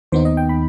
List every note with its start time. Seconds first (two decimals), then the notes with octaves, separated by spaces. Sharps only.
0.12 D#2 D#3 B3 D#4 C5
0.25 D#5
0.37 G5
0.49 B5